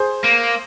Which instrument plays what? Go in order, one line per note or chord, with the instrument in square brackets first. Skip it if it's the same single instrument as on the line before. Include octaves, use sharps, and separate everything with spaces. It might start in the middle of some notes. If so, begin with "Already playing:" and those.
Already playing: [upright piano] G#4 C5
[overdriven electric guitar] A#3